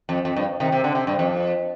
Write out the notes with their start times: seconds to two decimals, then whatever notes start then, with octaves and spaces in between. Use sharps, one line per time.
0.09 F2
0.25 F2
0.36 G2
0.60 C3 D#3
0.72 C3
0.84 D3
0.95 C3
1.07 G2
1.19 F2